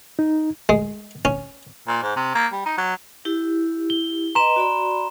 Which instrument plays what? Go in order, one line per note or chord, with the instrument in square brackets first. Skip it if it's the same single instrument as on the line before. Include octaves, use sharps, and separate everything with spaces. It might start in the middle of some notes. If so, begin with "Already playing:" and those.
[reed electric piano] D#4
[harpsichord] G#3
C#4
[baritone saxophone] A#2
G#2
C3
A#3
G3
D#4
F#3
[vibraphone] E4 G4
[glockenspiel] G7
[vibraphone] B4 D#5 [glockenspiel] A#5 C6 E7
[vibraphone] F#4 D5 B5